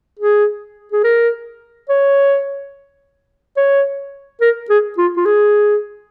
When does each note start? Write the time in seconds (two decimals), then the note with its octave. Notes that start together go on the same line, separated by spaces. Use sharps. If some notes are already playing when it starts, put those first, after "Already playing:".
0.19 G#4
0.92 G#4
1.04 A#4
1.89 C#5
3.57 C#5
4.41 A#4
4.70 G#4
4.98 F4
5.17 F4
5.26 G#4